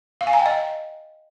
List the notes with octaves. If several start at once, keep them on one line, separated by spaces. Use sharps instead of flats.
F5
G#5
A#5
G5
D#5